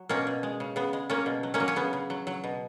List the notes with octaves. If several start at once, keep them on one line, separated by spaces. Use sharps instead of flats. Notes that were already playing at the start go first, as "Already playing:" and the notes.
Already playing: F#3
B2 A#3 C#4
B2
G#3
C#3
C#3 B3
G#3
F#3 A#3 C#4
B2
F#3
A#3 C#4
F#3
C#4
C#3 B3
C#3
F#3
F#3
B2